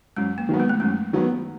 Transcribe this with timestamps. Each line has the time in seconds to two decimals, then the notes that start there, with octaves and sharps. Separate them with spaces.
0.17 F#2 G#3
0.38 A#3
0.49 D#3 F#3 B3
0.60 G#3
0.69 A3
0.80 F#2 G#3
1.13 D#3 F#3 B3